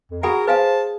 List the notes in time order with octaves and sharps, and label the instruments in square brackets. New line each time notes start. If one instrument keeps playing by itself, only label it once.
[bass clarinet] F2
[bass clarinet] F#4 [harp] G#4 [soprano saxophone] A#4 [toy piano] F#5 G#5 B5
[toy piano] B4 F5 G#5 [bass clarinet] C5 [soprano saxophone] A5